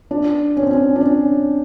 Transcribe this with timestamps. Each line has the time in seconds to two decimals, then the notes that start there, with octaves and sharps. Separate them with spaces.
0.11 D4
0.57 C#4
0.63 C4
0.71 C#4
0.96 D4
1.01 C#4